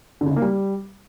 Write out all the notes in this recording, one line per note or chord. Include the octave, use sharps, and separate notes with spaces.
D3
C#3
D#4
A#3
G3